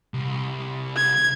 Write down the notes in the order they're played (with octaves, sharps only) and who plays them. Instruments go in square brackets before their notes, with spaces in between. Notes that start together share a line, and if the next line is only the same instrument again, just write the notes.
[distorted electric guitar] C2
[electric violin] G#6